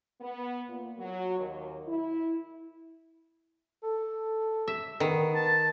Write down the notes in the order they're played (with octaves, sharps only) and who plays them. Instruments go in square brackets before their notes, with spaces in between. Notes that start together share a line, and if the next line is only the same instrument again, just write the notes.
[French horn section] B3
A#2
F#3
D#2
E4
[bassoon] A4
[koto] E5
[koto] D#3 [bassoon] B3
[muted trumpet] A5